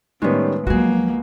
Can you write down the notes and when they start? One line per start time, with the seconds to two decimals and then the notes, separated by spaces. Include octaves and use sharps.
0.22 A2 D#3 G3 G#3 B3 C#4
0.67 C#2 F3 F#3 A#3 F#4 G#4